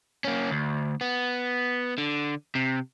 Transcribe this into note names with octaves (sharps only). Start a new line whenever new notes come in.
A#3 C#4
D2
B3
D3
C3